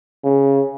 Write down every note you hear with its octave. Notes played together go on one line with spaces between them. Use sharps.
C#3